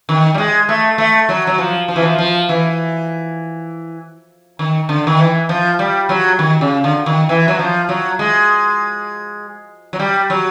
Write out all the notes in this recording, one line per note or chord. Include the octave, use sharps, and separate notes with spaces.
D#3
G3
G#3
A3
A3
F#3
F#3
F3
F3
E3
F3
F3
E3
D#3
D3
D#3
E3
F3
G3
F#3
D#3
C#3
D3
D#3
E3
F#3
F3
F#3
G#3
F#3
G3
F#3